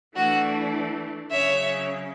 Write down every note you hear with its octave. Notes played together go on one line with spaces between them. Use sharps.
E3 A3 D4 F#4
C#3 F#3 C#4 C#5 E5